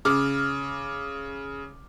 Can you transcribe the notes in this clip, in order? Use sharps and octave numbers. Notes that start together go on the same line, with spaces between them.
C#3 D6 F6